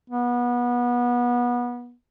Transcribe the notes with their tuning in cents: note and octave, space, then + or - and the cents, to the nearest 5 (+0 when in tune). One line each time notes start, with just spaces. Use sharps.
B3 -25